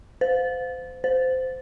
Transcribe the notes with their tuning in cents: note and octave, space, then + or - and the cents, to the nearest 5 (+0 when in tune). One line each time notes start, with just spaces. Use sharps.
C5 -30
C5 -20